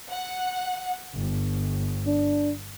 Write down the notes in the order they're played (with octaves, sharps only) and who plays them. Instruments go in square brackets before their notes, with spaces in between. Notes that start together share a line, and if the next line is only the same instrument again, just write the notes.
[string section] F#5
G1
[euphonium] D4